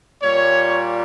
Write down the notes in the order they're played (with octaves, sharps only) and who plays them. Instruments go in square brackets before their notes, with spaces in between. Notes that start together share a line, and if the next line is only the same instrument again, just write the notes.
[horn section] A#2 G3 C#5